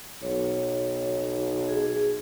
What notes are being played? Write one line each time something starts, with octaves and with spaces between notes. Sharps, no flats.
B1 C#5
G#4